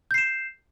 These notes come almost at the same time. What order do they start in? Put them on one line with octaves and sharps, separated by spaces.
G6 C7 E7